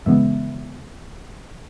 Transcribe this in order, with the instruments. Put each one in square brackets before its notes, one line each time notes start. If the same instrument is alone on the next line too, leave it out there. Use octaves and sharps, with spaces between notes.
[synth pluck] F#2 C#3 E3 G#3 B3 E5